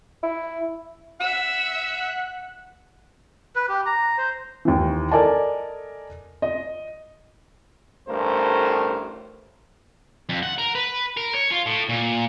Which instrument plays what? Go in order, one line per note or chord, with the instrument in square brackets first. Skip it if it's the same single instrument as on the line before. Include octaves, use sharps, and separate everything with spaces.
[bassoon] E4
[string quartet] E5 E6 [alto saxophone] F#5
[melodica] B4
G4
A#5
C5
[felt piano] D#2 E3
A4 A#4 D5 D#5 G#5 A5
D#5
[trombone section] A1 G2 A3 A#4 C5
[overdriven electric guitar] F2
F#5
A#4
B4
A#4
C#5
F4
A2
A#2